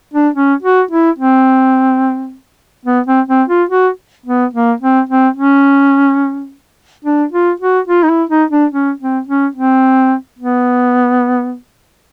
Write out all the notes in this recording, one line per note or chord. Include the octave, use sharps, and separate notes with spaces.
D4
C#4
F#4
E4
C4
B3
C4
C4
F4
F#4
B3
A#3
C4
C4
C#4
D4
F4
F#4
F4
D#4
E4
D#4
D4
C#4
C4
C#4
C4
B3